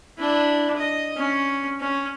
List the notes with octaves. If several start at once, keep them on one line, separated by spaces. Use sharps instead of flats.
D4 E4
D#5
C#4
C#4